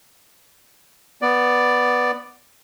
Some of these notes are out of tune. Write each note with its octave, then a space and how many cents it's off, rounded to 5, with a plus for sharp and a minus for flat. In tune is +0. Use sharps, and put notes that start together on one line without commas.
B3 +0 D5 +5